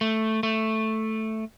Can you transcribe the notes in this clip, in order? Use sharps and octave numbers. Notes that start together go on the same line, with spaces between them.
A3
A3